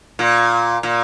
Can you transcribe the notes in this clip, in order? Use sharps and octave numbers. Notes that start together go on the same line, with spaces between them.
A#2
A#2